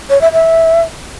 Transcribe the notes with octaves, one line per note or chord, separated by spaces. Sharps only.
C#5
E5
E5